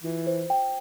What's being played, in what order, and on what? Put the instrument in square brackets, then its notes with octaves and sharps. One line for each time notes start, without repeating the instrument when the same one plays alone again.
[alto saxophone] E3 [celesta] F4
[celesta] C5
G5